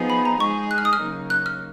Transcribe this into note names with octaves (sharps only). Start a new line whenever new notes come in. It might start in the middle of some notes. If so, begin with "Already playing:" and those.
Already playing: F3 B3 D#4 G#4
B5
A#5
G#3 D#4 G#4 C#6
F#6
F6
D#6
F6
C#3 F#3 A#3 D#4
F#6
F6